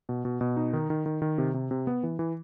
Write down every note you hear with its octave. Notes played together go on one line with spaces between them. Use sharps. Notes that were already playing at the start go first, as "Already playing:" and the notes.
B2
B2
B2
D#4
D#3
D#3
D#3
D#3
C3
C3
C3
B3
E3
E3